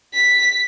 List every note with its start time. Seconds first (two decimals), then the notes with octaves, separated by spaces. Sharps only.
0.14 B6